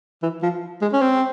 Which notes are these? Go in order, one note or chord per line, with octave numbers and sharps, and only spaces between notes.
E3
F3
G#3
C#4
C4